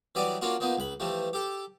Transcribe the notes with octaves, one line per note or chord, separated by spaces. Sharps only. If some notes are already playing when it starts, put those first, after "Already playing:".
E3 F#3 G3 D5 D#6
A#3 C#4 D4 F4 F#4
F3 A#3 B3 D#4
C#2 B5
E3 F3 G3 A3
G4 A4